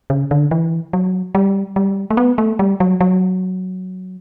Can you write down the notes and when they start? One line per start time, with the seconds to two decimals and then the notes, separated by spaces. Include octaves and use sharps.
0.10 C#3
0.31 D3
0.51 E3
0.93 F#3
1.35 G3
1.76 G3
2.10 A3
2.17 B3
2.38 A3
2.59 G3
2.80 F#3
3.01 F#3